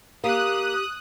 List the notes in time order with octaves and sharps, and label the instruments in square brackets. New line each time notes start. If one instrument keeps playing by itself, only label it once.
[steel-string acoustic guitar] A#3 [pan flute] G4 [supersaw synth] D#6 F#6